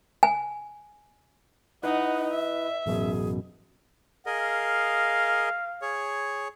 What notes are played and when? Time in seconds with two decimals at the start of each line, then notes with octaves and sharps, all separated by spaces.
0.23 G#5
1.83 D#4 E4 B4 D#5 F#5
2.32 E5
2.86 A1 F#2 B2 G#4
4.26 G#4 A#4 D#5 F5
5.82 G#4 C#5